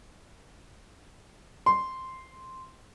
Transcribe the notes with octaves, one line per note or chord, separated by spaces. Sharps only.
C6